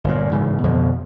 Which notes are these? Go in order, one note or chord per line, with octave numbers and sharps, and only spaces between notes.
G1 A#2
G#2 C#3 E3
F2 B2 D3 F3